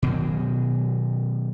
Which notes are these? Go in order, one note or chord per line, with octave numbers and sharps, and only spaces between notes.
B2 D#3 F#3